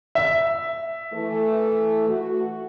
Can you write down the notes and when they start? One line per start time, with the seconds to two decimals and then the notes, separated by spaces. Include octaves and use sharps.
0.15 E5
1.13 E3 A3
2.09 F#4